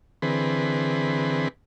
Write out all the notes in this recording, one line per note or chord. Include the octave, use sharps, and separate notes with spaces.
D3 E3 C4 G#4 B4